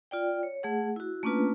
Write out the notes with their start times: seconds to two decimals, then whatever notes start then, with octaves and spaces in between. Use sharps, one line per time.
0.11 F4 D5 G5
0.43 C#5
0.63 A3 G#4 F#5
0.96 E4 F#4
1.23 A3 A#3 C#4 D4 F4 B4